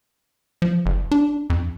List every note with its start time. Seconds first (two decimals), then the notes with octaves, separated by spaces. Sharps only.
0.62 F3
0.86 F#1
1.12 D4
1.50 F2